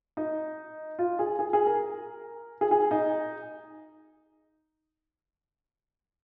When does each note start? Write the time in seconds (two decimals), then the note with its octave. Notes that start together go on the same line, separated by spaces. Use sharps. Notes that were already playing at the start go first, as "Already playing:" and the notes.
0.17 D#4
0.99 F4
1.19 G#4
1.39 G#4
1.53 G#4
1.66 A#4
2.61 G#4
2.71 G#4
2.91 D#4